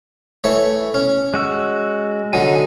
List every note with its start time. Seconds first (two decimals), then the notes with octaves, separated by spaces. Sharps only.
0.44 E3 A3 C#5
0.94 C#4
1.34 G#3 F#4 E6
2.33 D3 F#3 D#4 G#5